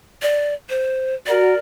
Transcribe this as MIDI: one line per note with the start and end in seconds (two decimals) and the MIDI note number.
0.22 0.54 74
0.69 1.14 72
1.27 1.55 66
1.27 1.55 70
1.27 1.58 74